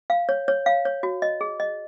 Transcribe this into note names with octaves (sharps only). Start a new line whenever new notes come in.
F5
C#5
C#5
F5
C#5
F#4
D#5
G#4
D#5